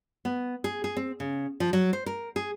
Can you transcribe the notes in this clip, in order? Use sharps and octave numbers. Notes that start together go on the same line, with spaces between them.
B3
G#4
G#4
C4
C#3
F3
F#3
C5
A#4
G#4